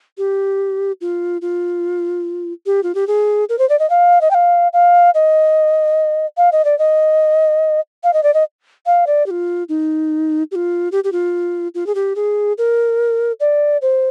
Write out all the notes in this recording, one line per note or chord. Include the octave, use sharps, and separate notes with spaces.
G4
F4
F4
G4
F4
G4
G#4
A#4
C5
D5
D#5
F5
D#5
G5
F5
F5
D#5
F5
D#5
D5
D#5
F5
D#5
D5
D#5
F5
D5
G4
F4
D#4
G4
F4
G4
G4
F4
F4
G#4
G4
G#4
A#4
D5
C5